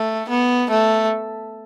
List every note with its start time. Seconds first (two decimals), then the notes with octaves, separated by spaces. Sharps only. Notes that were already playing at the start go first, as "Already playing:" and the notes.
Already playing: A3
0.29 B3
0.70 A3